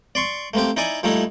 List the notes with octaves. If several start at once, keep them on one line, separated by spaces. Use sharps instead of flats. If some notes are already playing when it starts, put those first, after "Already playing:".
D5 C6 C#6
A3 A#3 C4 G4
D#4 E4 D5 G#5
A#2 G3 A3 D#4 E4